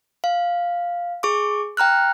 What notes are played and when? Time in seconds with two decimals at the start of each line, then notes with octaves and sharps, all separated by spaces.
0.24 F5
1.23 G#4 C#6 D6
1.77 G5 A#5 F6 F#6